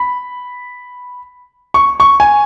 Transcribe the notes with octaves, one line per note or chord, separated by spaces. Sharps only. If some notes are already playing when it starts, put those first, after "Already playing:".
Already playing: B5
C#6
C#6
G#5